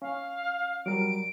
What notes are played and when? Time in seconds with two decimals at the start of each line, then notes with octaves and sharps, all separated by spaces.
0.02 C#4 F5
0.86 F#3 G3 A#4 D7